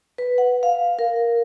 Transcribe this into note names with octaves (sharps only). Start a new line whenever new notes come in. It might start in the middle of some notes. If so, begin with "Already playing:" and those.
B4
F#5
F5
A#4